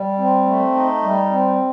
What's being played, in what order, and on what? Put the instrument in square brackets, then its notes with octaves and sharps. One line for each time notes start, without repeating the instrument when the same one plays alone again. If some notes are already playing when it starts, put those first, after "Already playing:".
Already playing: [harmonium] G3
C4
A3
D#4
G3
C4